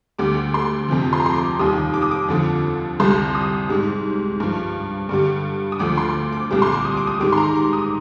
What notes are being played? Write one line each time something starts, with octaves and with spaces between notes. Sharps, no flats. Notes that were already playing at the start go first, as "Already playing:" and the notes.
D2 D3 G3 D6
C6
F2 C3 F3
C6
A#5
C6
D6
D#2 D#3 G3 D#6
D6
D#6
D6
F2 D3 F3
C2 C3 G3 C6
D#6
G#2 G3
G2 F3
G2 D3 G3
D#6
D2 D3 F3 D6
C6
D6
C2 A#2 G3 D6
C6
D6
D#6
D6
D#6
G#2 D#3 G3 D6
C6
A#5
D6
D#6